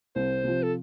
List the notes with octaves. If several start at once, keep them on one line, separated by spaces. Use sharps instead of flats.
C2 C5
C3 F3
A4